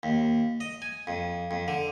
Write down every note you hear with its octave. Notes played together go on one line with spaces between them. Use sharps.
D#2
D#5
G#5
F2
F2
D3